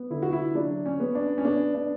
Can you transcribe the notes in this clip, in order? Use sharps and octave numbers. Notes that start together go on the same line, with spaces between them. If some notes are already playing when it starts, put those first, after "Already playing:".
Already playing: B3
D3 E4
F#4
E4
F#3 D4
C#4
B3
D4
C#4
B3 D4
D4